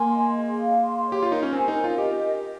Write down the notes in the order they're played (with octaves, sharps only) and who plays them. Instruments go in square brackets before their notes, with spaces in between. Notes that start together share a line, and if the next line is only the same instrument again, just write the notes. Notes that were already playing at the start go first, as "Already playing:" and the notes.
Already playing: [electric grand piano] A#3 [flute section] G#5 C6
[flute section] D#5
G#4
F5
C6
C#5
[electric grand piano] G4
F4
[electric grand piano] D#4 [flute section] A#4
[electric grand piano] C#4
[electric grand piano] C4 [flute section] G#5
[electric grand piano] D#4
[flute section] A#4
[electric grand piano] F4
[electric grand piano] G4 [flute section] D#5
[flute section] A#4